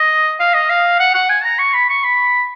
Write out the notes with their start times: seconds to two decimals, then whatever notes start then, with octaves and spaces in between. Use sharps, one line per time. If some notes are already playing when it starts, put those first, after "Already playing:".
Already playing: D#5
0.40 F5
0.54 D#5
0.70 F5
0.99 F#5
1.14 F#5
1.29 G#5
1.44 A#5
1.59 C#6
1.74 B5
1.89 C#6
2.04 B5